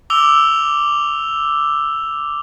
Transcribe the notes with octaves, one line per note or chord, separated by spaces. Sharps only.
D6 E6 F7 G7